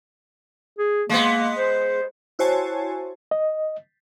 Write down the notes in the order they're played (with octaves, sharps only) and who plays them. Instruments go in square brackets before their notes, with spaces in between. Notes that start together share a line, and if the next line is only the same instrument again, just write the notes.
[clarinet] G#4
[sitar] G#3 B3 [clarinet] A#3
[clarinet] C5
[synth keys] E4 F#4 C5 C#5 G#5 A5
[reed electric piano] D#5